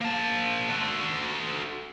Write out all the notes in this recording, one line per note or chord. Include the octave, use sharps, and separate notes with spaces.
A#3 A5
F#4 A4